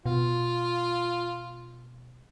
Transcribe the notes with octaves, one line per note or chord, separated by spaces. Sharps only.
B2 F4